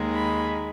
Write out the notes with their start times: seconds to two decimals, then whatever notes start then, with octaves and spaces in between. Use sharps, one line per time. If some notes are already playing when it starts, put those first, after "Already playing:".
Already playing: D#2 D#3 G#3
0.12 B5